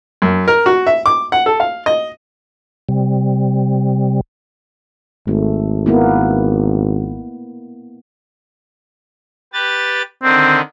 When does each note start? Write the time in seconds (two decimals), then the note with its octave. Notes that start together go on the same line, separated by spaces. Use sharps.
0.22 F#2
0.48 A#4
0.66 F#4
0.87 E5
1.06 D6
1.32 F#5
1.46 A4
1.60 F5
1.86 D#5
2.89 C3 G3
5.28 G#1 A3
5.86 A#3 B3 E4
9.53 G4 B4 A6
10.23 D3 D#3 C4